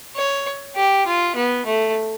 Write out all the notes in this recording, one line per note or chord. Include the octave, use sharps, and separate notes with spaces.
C#5
G4
F4
B3
A3